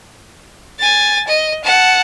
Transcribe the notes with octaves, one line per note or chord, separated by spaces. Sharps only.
G#5 A6
D#5
F#5 A5